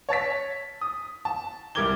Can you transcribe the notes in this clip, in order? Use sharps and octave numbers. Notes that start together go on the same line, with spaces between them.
C#5 A5 A6 B6
D#6
A5
C2 G3 A#4 D6 G#6 G7